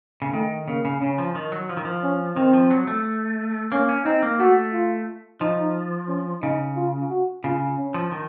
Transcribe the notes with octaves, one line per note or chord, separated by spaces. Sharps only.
C#3
D#3 A3
C#3 A#3
C#3
C#3 C#4
F3
D#3
F#3
F3
D#3
F3
C#4
D#3 C4
F3
F#3
A3
A#3 C#4
C#4
C4 D#4
A#3
A3 F#4
F4
F3 D#4
C#4
C#3 D#4
F4
F#4
C#3 F4
C#4
F3
D#3